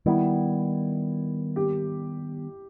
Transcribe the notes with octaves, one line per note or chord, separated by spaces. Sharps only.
D#3 G3 B3 E4
G4